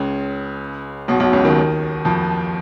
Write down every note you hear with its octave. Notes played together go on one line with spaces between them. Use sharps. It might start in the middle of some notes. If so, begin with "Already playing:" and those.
Already playing: C#2 C#3
B1 B2
B1 B2
C#2 C#3
D#2 D#3
F2 F3